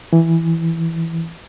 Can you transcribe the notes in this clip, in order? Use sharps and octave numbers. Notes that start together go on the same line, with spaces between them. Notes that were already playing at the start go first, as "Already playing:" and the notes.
E3